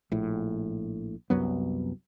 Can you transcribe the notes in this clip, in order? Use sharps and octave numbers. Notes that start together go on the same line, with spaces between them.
A#1 A2
C2 F#2 F#3 B3